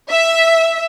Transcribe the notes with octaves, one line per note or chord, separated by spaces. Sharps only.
E5